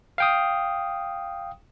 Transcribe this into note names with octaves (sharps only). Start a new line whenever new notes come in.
F5 G5 D#6